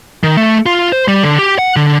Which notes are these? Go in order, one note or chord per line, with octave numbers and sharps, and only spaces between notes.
D#3
A3
F4
C5
G3
D3
G4
F#5
D3